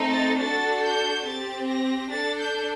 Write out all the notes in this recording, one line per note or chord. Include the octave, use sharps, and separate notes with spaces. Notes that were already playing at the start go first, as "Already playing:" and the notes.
Already playing: A3 C4 D#4 A4
A6
D4 F#4 A4 A6
G6
C4 G4 A6
A#6
D4 A4 A6
G6